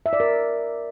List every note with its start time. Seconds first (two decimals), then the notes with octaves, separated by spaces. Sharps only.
0.06 E5
0.13 D5
0.20 A#4